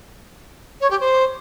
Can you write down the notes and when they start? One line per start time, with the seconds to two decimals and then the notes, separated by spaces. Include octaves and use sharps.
0.81 C#5
0.90 G4
1.00 C5